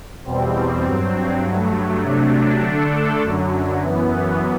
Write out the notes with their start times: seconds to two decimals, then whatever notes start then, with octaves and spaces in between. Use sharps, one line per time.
0.25 E2 B2 G3 C4
0.85 G2 F#3 C4
1.44 G2 F#3 A3
2.04 C3 F#3 A3 D4
2.63 D3 A3 D4 A4
3.23 F#2 D3 F#3
3.82 F#2 E3 B3